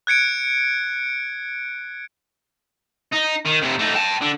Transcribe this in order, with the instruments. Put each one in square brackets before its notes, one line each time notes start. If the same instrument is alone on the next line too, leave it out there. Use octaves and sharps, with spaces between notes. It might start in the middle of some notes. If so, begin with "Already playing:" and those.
[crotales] F#6 G#6 C#7 D7
[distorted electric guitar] D#4
D#3
F2 C3
A3 D#4
G5 A5
D3